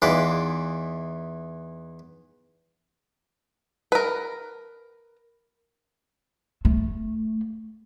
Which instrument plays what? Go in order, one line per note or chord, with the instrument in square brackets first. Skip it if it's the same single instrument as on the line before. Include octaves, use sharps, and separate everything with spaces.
[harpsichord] E2 E3 D#4 F4 B4 D6
[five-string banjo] A#4 B4
[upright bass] A3